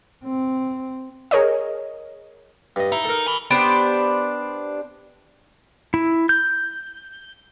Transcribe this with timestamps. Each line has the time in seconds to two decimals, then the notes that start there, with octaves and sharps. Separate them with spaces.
0.24 C4
1.31 G#4 A#4 C#5 D#5
2.76 G2 D#5
2.92 D#4 E4
3.04 A4 A#4
3.27 G#5 B5
3.50 B3 D4 G4 C5
5.94 E4
6.29 G6